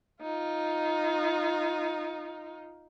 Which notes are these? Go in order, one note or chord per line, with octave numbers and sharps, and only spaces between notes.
D#4 F4